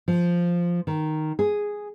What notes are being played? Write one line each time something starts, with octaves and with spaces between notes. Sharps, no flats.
F3
D#3
G#4